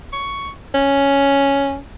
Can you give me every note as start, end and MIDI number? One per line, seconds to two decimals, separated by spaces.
0.13 0.50 85
0.74 1.78 61